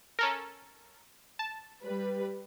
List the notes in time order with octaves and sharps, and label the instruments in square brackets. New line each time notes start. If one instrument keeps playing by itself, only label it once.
[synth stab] C#4 A4 A#4
A5
[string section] G3 B4